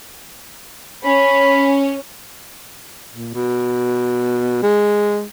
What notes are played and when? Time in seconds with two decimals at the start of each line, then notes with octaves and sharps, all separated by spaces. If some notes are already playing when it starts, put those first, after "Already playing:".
1.03 C#4 B5
3.15 A#2
3.34 B2
4.62 G#3